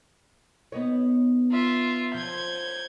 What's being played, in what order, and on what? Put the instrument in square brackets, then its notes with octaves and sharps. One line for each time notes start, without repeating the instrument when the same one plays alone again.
[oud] B3 D#4 C#5
[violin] F4 E5
[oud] F3 [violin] G6 G#6